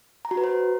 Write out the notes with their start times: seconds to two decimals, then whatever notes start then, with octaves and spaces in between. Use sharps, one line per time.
0.25 A#5
0.31 F#4
0.37 B4
0.44 C5